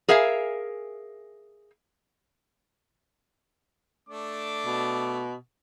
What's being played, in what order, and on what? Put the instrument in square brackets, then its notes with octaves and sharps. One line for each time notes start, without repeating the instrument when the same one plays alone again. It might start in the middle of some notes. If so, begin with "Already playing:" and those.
[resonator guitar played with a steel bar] G#4 A#4 E5 F5 G#5
[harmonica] A3 D4 [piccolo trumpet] D6
[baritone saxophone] B2